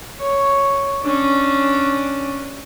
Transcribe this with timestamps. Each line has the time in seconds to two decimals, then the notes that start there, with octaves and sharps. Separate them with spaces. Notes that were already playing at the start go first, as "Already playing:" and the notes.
0.20 C#5
1.03 C#4 D4